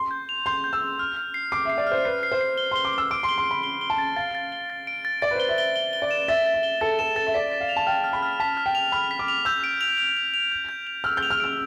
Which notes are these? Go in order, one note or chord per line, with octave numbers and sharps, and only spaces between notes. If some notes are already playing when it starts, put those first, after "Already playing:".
Already playing: C6
G6
F7
C6 G6
G6
E6
G6
F6
F6
C7
D6 C7
E5
C7
D5
F6
C5
B4 C7
C7
C5
C7
G7
C6
G7
D6
E6 G7
D6 D7
C6
G7
C6
B5 G7
G7
G7
A5
A6
F5 A6
A6
G7
A6
D7
A6
D5 A6
B4
C5
G7
E5
G7
G7
G7
D5
E7
E5 A6
A6
E5
G7
A4 A6
A4 E7
A4 A6
E5
D5 B6
B6
F5
F7
A5
G5 F6
F6
B5
F6
A5 B6
F6
G5
F7
B5 F6
B6
D6
F7
E6 G6
D7
F7
F7
F7
F7
G6
G6
F7
E6 F6
G6
F7
F6
E6 D7